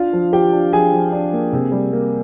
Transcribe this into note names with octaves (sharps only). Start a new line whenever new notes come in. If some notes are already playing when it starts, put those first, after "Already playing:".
Already playing: D4 F4 F5
F3
F3 G4 G5
D4
F3 G#4 G#5
F3
D4
A#3
C3
G3
A#3